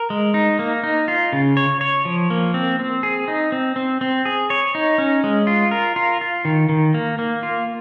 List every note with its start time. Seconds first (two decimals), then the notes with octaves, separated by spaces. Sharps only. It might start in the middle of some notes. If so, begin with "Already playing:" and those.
Already playing: A#4
0.10 G#3
0.34 D#4
0.59 A#3
0.84 D#4
1.08 F4
1.33 C#3
1.57 C#5
1.81 C#5
2.05 F3
2.30 A#3
2.54 C4
2.79 C4
3.03 G#4
3.28 D#4
3.52 C4
3.76 C4
4.01 C4
4.25 G#4
4.50 C#5
4.75 D#4
4.98 C#4
5.24 G#3
5.47 F4
5.71 A#4
5.96 F4
6.21 F4
6.45 D#3
6.69 D#3
6.94 A#3
7.19 A#3
7.43 F4